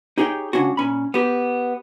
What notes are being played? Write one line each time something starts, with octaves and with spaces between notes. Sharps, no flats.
D#4 G4 G#4 C#5 G5
C#2 C#4 D4 F#4
A#2 C#4 B5
B3 G4